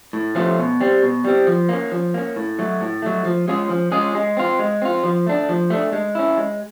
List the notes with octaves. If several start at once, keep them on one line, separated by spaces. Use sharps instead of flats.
A2
F3 A3 C#4 F4
B2
G3 C4
B2
G3 C4
F3
A#3 C#4
F3
A#3 C#4
A2
F#3 A3
A2
F#3 A3
F3
G#3 C#4 F4 G#4
F3
G#3 C#4 F4 G#4
G#3
C4 F4
G#3
C4 F4
F3
A3 D4
F3
A3 D4
G#3
C#4 E4
G#3